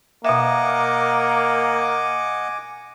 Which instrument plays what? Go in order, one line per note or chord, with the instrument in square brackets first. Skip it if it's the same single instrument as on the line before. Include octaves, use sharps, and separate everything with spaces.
[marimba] B2 E5 [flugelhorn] A#3 [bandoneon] D#5 F#5 [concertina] G#5 D6